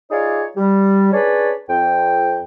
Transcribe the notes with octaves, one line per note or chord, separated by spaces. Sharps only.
D#4 F4 G#4 C#5 D5
G3
C#4 D4 G#4 B4 C#5 D5
F2 G5